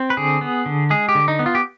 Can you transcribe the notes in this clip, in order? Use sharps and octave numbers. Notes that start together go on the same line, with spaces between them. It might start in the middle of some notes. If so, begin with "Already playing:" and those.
Already playing: C4
B4
D3 G#4
B3
D3
G#3 G#4
G4
D3
D#4
B3
F4
G4